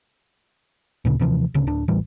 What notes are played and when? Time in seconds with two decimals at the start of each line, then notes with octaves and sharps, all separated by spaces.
1.05 D2 A#2 C#3
1.19 D#2 C3 E3 F3
1.54 D1 D2 C#3
1.67 D1 D4
1.88 D1 A1 E3 G3